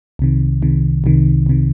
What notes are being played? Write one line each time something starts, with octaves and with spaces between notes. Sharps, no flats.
C2 C3 D#3
C2 C3 D#3
C2 C3 D#3
C2 C3 D#3